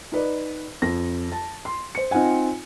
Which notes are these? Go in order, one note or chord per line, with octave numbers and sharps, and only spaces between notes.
D#4 B4 D5
F2 A#6
A5
C6
C5 C#7
C4 D#4 F4 F#5 G#5